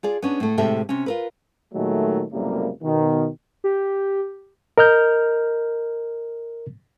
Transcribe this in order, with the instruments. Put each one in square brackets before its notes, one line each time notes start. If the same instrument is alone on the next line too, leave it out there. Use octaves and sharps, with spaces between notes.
[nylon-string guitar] F4 G#4 D5
B3 C#4 D4
A2 A3
A2 C3 G#3 G4 A4 E5
C3 C#4
F4 A#4 B4
[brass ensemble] A#2 D#3 F#3 G#3 A3
C#2 F#2 A2 C3 G3 A#3
B2 D#3
[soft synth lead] G4
[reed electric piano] A#4 D#5 F6 G6